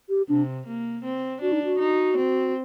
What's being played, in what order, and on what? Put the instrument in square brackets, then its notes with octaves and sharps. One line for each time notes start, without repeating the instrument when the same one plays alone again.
[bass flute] G4
[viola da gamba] C3 [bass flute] D4
[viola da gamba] A#3
C4
[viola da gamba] D4 [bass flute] F#4
[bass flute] D#4
F#4
[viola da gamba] D#4
C4